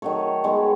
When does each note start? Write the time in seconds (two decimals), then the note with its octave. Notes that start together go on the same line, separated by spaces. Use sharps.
0.02 D#3 F#3 A3 C#5
0.44 D#3 G#3 B3